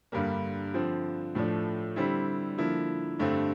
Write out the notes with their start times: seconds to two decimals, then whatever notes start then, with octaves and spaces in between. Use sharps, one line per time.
0.12 G2 D3 G3 A#3
0.74 D3 F3 C4
1.35 A2 F3 A3 D4
1.96 D3 G3 C4 E4
2.58 D3 F3 A#3 E4
3.19 G2 D3 A3 C4